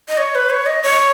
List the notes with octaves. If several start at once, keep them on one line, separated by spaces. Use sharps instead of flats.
D#5
C#5
B4
C#5
D#5
C#5